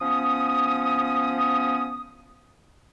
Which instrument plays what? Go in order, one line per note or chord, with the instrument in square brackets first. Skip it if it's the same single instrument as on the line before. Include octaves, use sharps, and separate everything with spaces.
[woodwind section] F3 B3 C#4 D#6